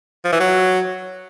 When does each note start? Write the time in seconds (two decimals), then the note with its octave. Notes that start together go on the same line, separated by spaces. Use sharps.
0.25 F3
0.32 E3
0.40 F#3